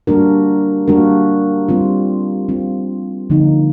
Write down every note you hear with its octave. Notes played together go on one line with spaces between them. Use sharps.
G3 A#3 D4 F#4 A#4
G3 A#3 D4 F#4 A#4
G3 C4 F4
G3 C4 F4
D3 F3 A#3 D#4